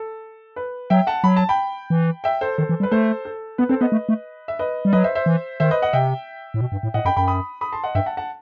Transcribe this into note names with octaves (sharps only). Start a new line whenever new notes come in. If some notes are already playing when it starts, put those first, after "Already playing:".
Already playing: A4
B4
F#3 E5 G5
F#5 A5
F#3 B5
A5
G5 B5
E3
E5 G5
A4 C5
D#3 A4 C5
E3
G3
B4
A3 A4 C5
A4
B3 B4
C4 A4 C5
B3 B4 D#5
A3
A3
E5
B4 D#5
G3
F#3 B4 D#5
C5 E5
C5 E5
E3
D#3 C5 E5
B4 D#5
D#5 F#5
C3 E5 G5
A2
B2
G2
A2
A2 D#5 F#5
F#2 G5 B5
F#2 G5 B5
B5 D#6
B5 D#6
A5 C6
D#5 F#5
G2 E5 G5
F#5 A5
F#5 A5